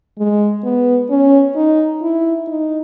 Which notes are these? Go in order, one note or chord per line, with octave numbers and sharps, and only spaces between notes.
G#3
B3
C#4
D#4
E4
D#4